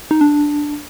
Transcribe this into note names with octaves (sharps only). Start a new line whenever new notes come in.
D#4
D4